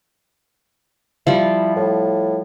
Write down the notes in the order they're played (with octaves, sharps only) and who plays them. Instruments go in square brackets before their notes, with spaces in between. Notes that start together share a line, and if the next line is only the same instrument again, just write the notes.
[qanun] F3 G3 F4 [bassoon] E4
[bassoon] A2